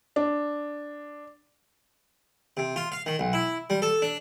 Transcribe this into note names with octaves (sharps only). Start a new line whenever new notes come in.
D4
C3
F4
F5
D#3
B1
E4
G3
A4
D4